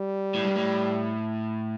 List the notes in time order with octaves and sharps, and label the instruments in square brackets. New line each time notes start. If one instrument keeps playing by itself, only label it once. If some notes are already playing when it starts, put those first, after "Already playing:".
Already playing: [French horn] G3
[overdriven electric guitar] A2
G2
A2